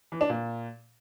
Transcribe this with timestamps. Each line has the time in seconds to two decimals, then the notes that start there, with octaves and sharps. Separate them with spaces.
0.12 E3
0.21 D4
0.30 A#2